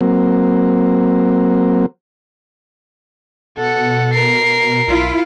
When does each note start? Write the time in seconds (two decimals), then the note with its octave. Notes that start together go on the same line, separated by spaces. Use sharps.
0.01 F#3 A#3 C4
3.57 B2 A4 F#5
4.14 A#4 C7
4.88 B1 E4 F4